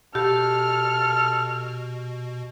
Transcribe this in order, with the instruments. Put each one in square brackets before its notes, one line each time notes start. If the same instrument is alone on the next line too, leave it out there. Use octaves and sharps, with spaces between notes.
[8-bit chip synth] B2 [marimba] G4 [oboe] A4 [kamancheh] F6